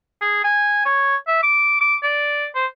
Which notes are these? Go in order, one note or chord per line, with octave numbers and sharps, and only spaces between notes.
G#4
G#5
C#5
E5
D6
D6
D5
C5